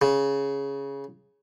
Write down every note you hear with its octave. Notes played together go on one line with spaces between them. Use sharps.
C#3